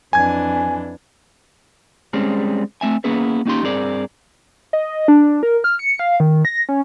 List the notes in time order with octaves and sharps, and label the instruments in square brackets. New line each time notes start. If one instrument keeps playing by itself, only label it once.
[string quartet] F2 E3 D4 [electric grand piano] G#5 G#6
[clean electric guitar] G3 G#3 C4 C#4 G#4
A3 A#3 C4 E5 G#5
A#3 B3 C#4 E4 G#4 B4
A#3 C#4 D#4 G4 C6
G2 C4 G#4 A#4 D5
[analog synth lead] D#5
D4
A#4
F6
C#7
F5
D#3
A#6
C#4